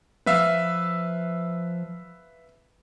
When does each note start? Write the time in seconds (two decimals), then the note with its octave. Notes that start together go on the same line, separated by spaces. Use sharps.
0.26 F3 B4 E5 F5